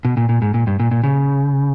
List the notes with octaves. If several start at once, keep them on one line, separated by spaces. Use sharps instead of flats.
B2
A#2
A#2
G#2
A#2
G2
A#2
A#2
C#3